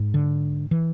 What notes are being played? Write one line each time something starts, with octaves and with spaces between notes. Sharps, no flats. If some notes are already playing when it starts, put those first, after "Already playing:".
Already playing: G#2
D3
E3